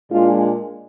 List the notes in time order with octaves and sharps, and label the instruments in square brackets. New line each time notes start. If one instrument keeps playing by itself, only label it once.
[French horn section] A#2 G#3 D4 F4